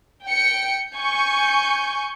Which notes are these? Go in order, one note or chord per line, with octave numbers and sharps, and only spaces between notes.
G5 C#7
G#5 C#6 G6